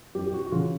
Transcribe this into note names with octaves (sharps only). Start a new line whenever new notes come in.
F#2 G4
G4
F#4
F#4
C#3 E3 F4